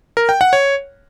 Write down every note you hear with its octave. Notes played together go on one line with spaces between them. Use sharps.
A#4
G5
F#5
C#5